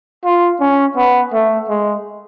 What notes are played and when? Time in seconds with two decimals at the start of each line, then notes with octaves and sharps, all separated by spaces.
0.25 F4
0.61 C#4
0.96 B3
1.33 A3
1.69 G#3